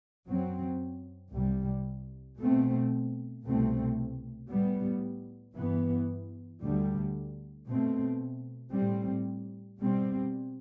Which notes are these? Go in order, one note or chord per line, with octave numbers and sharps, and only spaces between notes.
F#2 F#3 C4
C2 C3 G3
B2 A3 C4
C2 B2 A3 C4
A2 G3 B3
G2 E3 B3
D2 D3 G3
B2 A3 C4
A2 G3 C4
B2 G3 C4